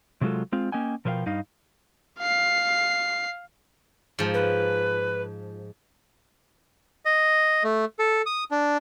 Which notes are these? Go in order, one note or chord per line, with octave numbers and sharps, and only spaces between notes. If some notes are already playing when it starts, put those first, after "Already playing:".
C3 F#3 G#3 F4 F#4 A4
G#3 C4 F4
A#3 C#4 D#5 G5 G#5
B2 F3 A#4 C5 F5 G5
G2 D#4 D#5 F5
F5 C7
G#2 F3
B4
D#5
A3
A4
D#6
D4